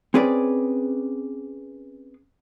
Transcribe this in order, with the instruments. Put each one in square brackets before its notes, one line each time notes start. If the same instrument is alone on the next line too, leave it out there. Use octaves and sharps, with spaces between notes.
[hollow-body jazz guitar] C4 C#4 G#4 B4 D5